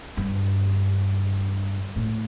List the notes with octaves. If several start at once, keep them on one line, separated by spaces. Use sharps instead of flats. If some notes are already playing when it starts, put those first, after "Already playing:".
G2
A2